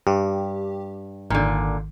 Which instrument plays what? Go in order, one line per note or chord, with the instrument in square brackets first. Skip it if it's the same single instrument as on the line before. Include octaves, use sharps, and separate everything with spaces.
[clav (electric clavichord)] G2 [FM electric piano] G4
[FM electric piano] G#1 D#3 [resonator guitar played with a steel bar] A#2 D3